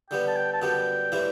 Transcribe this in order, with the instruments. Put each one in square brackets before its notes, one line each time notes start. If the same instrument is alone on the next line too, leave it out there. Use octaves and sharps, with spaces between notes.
[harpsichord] D3 G3 B3 [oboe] G5
[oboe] A5
G5
A5
[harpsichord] F#2 D3 G3 B3 [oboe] G5
[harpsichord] A2 E3 G3 C4 E4